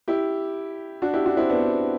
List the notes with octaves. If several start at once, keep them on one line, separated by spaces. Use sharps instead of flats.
E4 G4
D4 F#4
E4 G4
D4 F#4
C4 E4
B3 D4